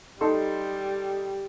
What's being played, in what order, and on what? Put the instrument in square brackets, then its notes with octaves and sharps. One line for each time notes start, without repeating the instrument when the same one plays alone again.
[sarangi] G3 [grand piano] D#4 A4 C6